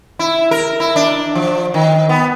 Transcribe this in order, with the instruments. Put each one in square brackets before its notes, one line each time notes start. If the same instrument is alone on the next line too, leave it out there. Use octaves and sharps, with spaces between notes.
[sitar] E4
A#4
E4
D4
F3
D#3
B3